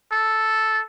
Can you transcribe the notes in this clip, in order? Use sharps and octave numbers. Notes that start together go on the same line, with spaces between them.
A4